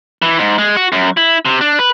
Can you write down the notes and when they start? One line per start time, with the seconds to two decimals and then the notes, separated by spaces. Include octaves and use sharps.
0.22 E3
0.39 G#2
0.58 G#3
0.77 F#4
0.92 F#2
1.17 E4
1.45 C3
1.61 D4
1.79 B4